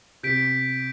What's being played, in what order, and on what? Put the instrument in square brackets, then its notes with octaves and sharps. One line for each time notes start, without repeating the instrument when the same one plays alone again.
[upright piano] C3 [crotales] G6 B6 D7